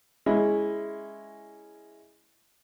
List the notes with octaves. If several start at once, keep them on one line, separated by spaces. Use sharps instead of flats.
G#3 C#4 E4